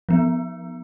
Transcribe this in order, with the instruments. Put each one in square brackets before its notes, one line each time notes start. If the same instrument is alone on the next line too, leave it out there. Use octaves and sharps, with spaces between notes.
[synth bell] F3 B3